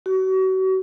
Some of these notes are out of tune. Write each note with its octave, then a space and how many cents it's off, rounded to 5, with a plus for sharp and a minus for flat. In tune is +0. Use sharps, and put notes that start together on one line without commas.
F#4 +35